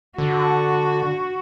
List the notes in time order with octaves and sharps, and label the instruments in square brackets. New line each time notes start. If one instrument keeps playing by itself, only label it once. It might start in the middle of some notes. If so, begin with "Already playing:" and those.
[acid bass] D3 [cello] F#4